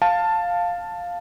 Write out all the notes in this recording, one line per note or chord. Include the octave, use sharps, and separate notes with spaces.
F5 A5